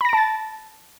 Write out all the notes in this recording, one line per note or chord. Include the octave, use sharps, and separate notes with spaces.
A5 B5 A6 A#6 D7